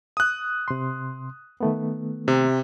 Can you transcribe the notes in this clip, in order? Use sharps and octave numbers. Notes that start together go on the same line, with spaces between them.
D#6 F#6
C3 C6
D#3 A3 B3
C3